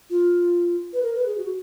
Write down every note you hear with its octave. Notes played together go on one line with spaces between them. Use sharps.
F4
B4
A#4
B4
G#4
F#4